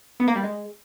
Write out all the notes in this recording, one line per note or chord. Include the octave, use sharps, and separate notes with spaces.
B3
A#3
G3
G#3